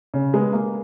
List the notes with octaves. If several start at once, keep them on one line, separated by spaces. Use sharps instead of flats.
C#3
G#3 B3
A#3